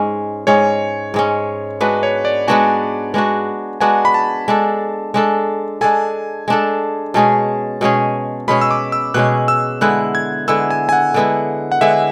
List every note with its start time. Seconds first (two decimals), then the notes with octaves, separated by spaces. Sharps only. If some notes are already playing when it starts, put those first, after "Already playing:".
Already playing: G#2 G#3 C#4
0.47 G#2 G#3 C#4 C#5
1.14 G#2 G#3 C#4
1.81 G#3 B3 D4 F#4 B4
2.03 C#5
2.25 D5
2.48 G#3 B3 D4 F#4 G#5
3.14 G#3 B3 D4 F#4
3.81 G#3 B3 D4 F#4 G#5
4.05 B5
4.14 A5
4.48 G#3 D4 A4
5.14 G#3 D4 A4
5.81 G#3 D4 A4 G#5
6.48 G#3 D4 A4
7.14 B2 G#3 C#4 G#4 A5
7.81 B2 G#3 C#4 G#4
8.48 B2 G#3 C#4 G#4 B5
8.61 E6
8.71 D6
8.92 E6
9.14 B2 G#3 C#4 G#4 F#6
9.48 E6
9.81 D3 G#3 B3 E4 F#6
10.15 G#6
10.48 D3 G#3 B3 E4 E6
10.71 G#5
10.89 G#5
10.93 F#5
11.14 D3 G#3 B3 E4
11.72 F#5
11.81 D3 G#3 B3 E4 E5